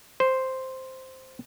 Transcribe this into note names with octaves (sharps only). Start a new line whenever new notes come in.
C5